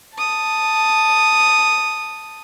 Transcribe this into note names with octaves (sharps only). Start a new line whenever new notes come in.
A5 D#6